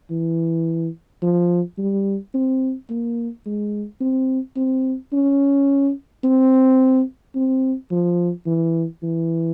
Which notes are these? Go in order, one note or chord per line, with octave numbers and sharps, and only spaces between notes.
E3
F3
G3
C4
A#3
G#3
C4
C4
C#4
C4
C4
F3
E3
E3